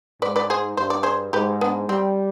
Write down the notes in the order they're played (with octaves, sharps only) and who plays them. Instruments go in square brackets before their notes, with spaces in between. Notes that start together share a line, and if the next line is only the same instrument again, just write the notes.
[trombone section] G#2 [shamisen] B4 D5
[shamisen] B4 D5
G#4 C5
[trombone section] G2 [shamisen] C5
[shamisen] D5
G#4 C5
[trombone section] G#2 [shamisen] G4 B4
[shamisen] B3 D4
[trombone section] G3 [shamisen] C4